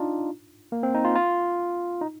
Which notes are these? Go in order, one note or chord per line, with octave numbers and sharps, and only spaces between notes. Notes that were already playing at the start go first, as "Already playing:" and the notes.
Already playing: D4 D#4 F4
A#3
C4
D#4
F4
F4
D#4